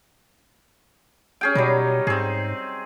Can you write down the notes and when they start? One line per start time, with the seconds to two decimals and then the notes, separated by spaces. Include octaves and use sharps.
1.41 C#4 G#4 G5
1.55 B2 F#3 G3 D#4
2.07 G#2 C4 G#4